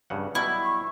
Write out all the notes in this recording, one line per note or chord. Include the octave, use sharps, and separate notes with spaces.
G2 C#3 F#5
B2 F#3 G3 E4
C#6